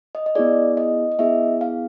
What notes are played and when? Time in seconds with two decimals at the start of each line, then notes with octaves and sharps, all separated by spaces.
0.15 D#5
0.26 D#5
0.35 B3 E4 G#4 D5
0.77 D#5
1.12 D#5
1.19 B3 E4 G#4 E5
1.61 F5